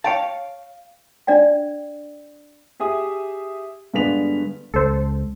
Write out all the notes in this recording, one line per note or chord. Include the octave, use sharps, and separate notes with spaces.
C#5 F5 G5 A5
D4 D5 G5
G4 G#4 E5 D#6
G2 D3 G#3 B3 B6 F7
C#2 A4 C5